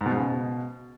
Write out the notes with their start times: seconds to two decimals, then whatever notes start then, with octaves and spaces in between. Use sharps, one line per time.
0.01 G#2
0.06 B2
0.11 G#2
0.16 C#3
0.21 B2